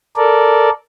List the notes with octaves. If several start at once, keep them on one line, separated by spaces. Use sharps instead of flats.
A4 A#4 D5